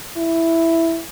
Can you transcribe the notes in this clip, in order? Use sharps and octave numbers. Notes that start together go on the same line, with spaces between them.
E4